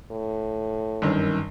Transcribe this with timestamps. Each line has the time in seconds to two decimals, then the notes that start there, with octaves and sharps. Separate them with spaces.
0.11 A2
1.02 G1 F#2 D#3